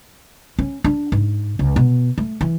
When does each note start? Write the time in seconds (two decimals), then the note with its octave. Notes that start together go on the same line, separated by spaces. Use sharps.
0.59 C#4
0.84 D4
1.12 G#2
1.59 C#2
1.76 B2
2.18 A3
2.41 E3